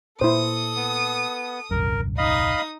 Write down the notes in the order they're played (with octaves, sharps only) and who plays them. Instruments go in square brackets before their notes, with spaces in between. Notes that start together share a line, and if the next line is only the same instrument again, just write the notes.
[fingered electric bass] A#2 [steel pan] E4 C5 [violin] A4 D#6
[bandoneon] B3
[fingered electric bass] D#1 C2 F#2 [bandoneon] A#4
[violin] D#4 D#6 [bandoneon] D#5 F5 B5